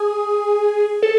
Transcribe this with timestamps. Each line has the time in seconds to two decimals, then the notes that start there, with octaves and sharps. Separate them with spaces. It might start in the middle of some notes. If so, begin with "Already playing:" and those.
Already playing: G#4
1.02 A4